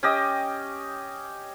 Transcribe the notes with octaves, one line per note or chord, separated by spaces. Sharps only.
C#4 G4 D#5